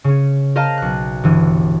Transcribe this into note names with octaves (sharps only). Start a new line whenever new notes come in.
C#3 C#4
A#4 C5 D#5 F5 A5 F6
B1 F#6
G1 E3